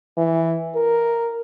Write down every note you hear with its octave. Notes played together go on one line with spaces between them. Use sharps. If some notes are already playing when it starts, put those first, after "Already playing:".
E3
A#4